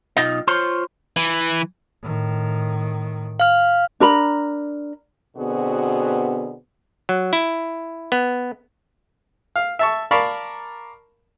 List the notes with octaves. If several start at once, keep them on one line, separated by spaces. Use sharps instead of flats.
B1 B2 D#4 F4 G4 D#5
F4 C5 C#5 C6
E3
A2 D#3
F5 F6
D4 A#4 A#5 B5
B2 D3 B3 C4 F#4 G#4
F#3
E4
B3
F5
E5 A5 C#6
A#4 D5 F5 A5 B5 C#6